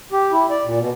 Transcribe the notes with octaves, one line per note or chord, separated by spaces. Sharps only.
G4
E4
D5
A#2
B2